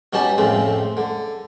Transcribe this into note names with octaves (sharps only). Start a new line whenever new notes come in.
B2 C#4 D#4 G4 A5 B5
F2 A2 C#3 C4
D3